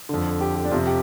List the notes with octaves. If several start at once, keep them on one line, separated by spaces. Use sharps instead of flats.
F2 D3
G4
G4
D4
F2 C3 F4
G4